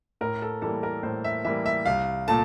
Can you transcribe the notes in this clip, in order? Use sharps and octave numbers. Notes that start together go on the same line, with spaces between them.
A2 A#4
A4
E3 G3 A#3 A4
A#4
A2 C5
E5
E3 G3 A#3 E5
E5
C2 F5
A#2 A3 A5